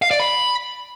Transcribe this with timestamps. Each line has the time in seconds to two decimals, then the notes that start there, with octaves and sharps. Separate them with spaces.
0.02 F5
0.11 D5
0.20 B5